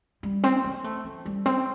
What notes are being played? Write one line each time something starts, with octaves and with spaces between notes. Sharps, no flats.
G3
C4
C4
A3
F3
G3
C4